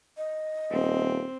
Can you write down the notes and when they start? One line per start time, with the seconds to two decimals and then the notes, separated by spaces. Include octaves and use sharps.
0.17 D#5
0.71 D#1 C4